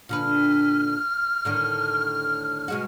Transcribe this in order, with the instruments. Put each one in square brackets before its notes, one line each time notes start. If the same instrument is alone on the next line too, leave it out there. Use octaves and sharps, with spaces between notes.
[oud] A#2 D3 B4 [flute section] F6
[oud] A2 D3 D#3
B2 G#3 F#4